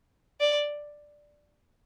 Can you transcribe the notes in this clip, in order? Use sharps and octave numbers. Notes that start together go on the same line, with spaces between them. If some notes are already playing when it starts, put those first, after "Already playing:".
D5